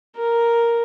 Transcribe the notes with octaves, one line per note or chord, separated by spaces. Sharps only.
A#4